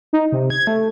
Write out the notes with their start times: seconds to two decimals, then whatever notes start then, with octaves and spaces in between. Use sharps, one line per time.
0.13 D#4
0.32 C3
0.50 G#6
0.67 A3